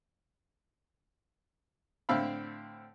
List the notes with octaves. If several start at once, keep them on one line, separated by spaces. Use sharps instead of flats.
A2 D3 C4 E5 F5 B5